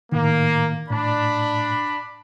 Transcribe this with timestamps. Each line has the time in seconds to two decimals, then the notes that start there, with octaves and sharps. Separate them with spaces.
0.12 A2 D#3 A#3
0.90 A2 D4 B5